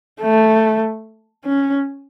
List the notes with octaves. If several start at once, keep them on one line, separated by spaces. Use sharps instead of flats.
A3
C#4